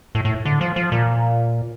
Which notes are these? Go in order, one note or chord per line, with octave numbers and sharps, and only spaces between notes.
A2
A2
D3
F3
F3
A#2